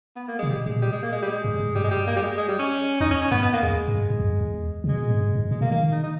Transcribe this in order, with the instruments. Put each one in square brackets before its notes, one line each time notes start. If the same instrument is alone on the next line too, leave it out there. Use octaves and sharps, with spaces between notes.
[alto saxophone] B3
A#3
[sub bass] C#3 [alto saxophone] G#3
[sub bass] B2 [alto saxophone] G3
[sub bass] A#2 [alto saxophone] G#3
[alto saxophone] G3
G#3
A#3
G#3
G3
G#3
[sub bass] G#2
G#2
[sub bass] G2 [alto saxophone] G3
[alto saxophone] G#3
G3
A#3
G3
G#3
G#3
G3
C#4
[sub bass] E2 [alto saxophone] D#4
[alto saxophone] C#4
C#4
[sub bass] G2 [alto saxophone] B3
[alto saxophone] B3
A#3
[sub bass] E2 [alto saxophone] G#3
[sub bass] G#2
G2
G#2
E2
G2
E2
C#3
[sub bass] B2 [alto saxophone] G#3
[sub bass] A#2
G#2
G2
G#2
[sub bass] A#2 [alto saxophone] G#3
[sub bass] B2 [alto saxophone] A#3
[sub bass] D#3 [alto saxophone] A#3
[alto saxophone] D#4
D#4